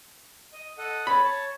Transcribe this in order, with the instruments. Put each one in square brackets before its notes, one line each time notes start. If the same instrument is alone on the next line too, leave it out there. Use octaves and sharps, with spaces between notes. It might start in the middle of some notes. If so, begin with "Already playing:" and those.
[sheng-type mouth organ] D#5
A4 D#5 F#5
[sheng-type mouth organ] C#5 A5 [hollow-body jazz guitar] B5
[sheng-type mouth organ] C#5 A5